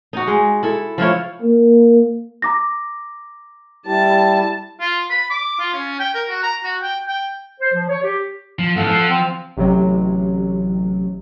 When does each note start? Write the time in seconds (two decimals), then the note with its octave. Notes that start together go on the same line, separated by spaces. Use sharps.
0.13 D#4 F#4
0.27 G#3
0.63 E4 A4
0.98 F3 E4 F4 C#5
1.42 A#3
2.42 A#5 D6 A#6
3.86 G3 E4 G4 A5
4.80 F4
5.10 B5
5.30 D6
5.59 F4
5.73 C#4
6.00 G5
6.15 A#4
6.29 F#4
6.43 A#5
6.64 F#4
6.82 G5
7.08 G5
7.61 C5
7.74 F3
7.89 C#5
8.03 G4
8.59 F3
8.76 G#2 E3 A4 F5 F#5
8.89 F3
9.08 C4
9.57 A1 C3 F#3